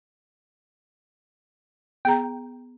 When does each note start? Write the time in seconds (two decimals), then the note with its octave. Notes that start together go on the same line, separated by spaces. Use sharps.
2.05 B3 G#4 G5 A#5